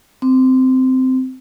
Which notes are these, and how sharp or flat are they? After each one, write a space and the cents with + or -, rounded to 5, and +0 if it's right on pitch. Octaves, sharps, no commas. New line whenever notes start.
C4 -15